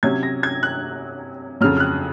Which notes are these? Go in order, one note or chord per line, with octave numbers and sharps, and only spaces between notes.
C3 F#3 C#4 G#6
A#6
G#6
F#6
F2 C#3 F#3 F6
F6
F#6